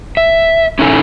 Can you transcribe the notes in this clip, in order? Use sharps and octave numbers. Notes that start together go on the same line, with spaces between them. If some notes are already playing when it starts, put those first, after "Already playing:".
E5
C#4 D#4 E4 A4 G#5